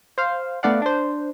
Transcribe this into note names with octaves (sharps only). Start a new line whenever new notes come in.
C5 F5
A3 B3 D4 D5 F5 F#5
D4 C5